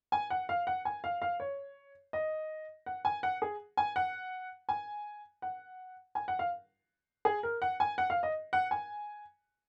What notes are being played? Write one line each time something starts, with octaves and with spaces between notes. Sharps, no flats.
G#5
F#5
F5
F#5
G#5
F5
F5
C#5
D#5
F#5
G#5
F#5
G#4
G#5
F#5
G#5
F#5
G#5
F#5
F5
G#4
A#4
F#5
G#5
F#5
F5
D#5
F#5
G#5